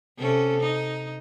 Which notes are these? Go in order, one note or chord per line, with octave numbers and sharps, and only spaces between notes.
C3 C#4 A4
D#4